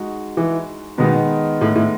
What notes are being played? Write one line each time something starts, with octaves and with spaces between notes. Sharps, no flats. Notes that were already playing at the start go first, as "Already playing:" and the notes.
Already playing: G#3 D#4 F#4
E3
B2 D#3 G#3 B3 D#4
A2
A2